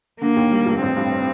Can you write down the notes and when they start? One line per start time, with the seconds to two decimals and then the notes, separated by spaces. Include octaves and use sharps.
0.21 D3 A#3
0.36 D#2
0.51 G3
0.66 F1
0.82 A1 C4
0.97 G2